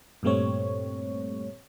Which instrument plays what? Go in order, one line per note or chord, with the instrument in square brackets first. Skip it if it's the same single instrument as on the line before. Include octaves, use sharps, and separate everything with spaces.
[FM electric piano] G2 A#2 G3 A3 C4 C#5